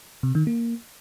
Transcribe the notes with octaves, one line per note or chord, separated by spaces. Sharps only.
C3
D#3
A#3